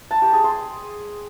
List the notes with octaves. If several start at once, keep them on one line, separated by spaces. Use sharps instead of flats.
A5
G4
G#4
C6